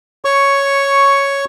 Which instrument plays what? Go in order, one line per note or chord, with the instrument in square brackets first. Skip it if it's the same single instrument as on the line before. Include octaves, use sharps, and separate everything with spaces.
[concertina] C#5 C#6